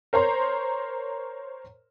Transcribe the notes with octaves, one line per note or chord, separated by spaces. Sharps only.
A#4 C5 C#5 A#5 C6